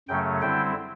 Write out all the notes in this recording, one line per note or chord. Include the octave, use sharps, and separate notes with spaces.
F#2 C#3 F#3 A3 C#4 G5
D3 G3 C4 E4 G5